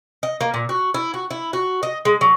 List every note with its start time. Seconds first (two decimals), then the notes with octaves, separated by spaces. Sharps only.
0.23 D#5
0.41 A#3
0.54 A#2
0.69 F#4
0.94 E4
1.14 F#4
1.31 E4
1.53 F#4
1.83 D#5
2.05 G#3
2.21 F#3